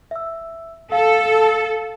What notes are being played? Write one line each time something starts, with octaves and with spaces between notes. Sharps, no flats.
E5 E6
A4 F5